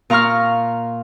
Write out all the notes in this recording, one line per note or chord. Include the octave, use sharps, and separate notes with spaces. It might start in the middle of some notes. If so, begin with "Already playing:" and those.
A#2 F5 A#5 C#6 F6